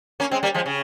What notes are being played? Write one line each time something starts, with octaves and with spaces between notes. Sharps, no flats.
A#3 C#4
G#3 C4
G3 A#3
F3 G#3
C#3